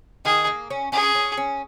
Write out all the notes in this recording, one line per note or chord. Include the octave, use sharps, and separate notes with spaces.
D#3 G#4
A#3
C#4
C#4 G#4
C#4
C#4